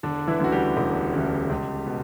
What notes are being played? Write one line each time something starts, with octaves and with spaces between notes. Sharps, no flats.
E1 D3 D4
E3 E4
D2 C#3 E3 F#4
G3 G4
E1
D2 C#3 E3
C#2
B2